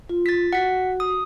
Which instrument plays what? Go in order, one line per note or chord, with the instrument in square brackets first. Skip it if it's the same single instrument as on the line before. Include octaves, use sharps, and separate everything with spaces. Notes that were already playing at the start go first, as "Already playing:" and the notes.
[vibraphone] F4
[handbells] A6 B6
[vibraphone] F#4 [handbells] F#5 B6
[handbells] D#6